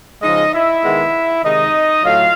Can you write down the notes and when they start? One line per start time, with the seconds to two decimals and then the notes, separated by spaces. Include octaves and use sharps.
0.22 C#3 F3 G#3 D#4 D#5
0.53 E4 E5
0.83 D#3 G#3 B3
1.43 C3 D#3 G#3 D#4 D#5
2.04 A2 F#3 A3 F4 F5